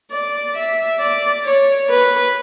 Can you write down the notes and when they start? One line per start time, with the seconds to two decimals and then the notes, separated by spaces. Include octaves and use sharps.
0.11 D5
0.55 E5
1.00 D5
1.45 C#5
1.90 B4